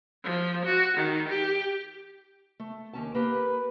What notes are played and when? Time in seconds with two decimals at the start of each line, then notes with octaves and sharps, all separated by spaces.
0.24 F3
0.65 F#4
0.97 D#3
1.28 G4
2.60 A3
2.93 D#2 C#4 A5
3.15 A#3 G4 B4